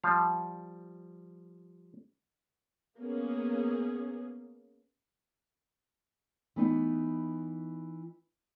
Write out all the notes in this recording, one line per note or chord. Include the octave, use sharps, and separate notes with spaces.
F3 G3 F5
A#3 B3 C#4 G#4
E3 B3 D#4